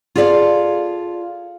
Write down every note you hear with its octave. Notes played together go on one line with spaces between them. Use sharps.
F4 G#4 A4 D5 E5 F5